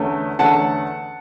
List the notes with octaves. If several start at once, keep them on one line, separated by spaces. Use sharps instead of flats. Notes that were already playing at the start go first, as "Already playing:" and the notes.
Already playing: E2 D3 A3 C#4
E2 D3 A3 C#4 F#5 A5